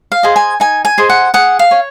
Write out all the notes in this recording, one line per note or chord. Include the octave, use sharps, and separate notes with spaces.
F5
G#4 C5 D#5
G#5
D#4 G#5
G#5
G#4 C5 D#5
F#5
G#4 F#5
F5
C#5